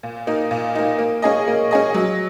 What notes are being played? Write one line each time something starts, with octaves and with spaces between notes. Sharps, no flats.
A#2
A#3 D#4
A#2
A#3 D#4
A#3
C#4 G#4 D#5
A#3
C#4 G#4 D#5
F#3